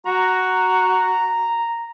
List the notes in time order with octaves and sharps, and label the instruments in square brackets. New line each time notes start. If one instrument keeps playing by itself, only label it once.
[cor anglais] F#4 [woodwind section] A#5